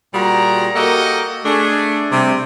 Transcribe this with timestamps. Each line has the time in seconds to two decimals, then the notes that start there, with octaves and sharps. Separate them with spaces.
0.13 A#2 G3 F#4 G#4 A#5
0.74 A#3 F#4 G4 A4 A#4 D#5
1.45 A3 D4 G#4
2.10 C3 G3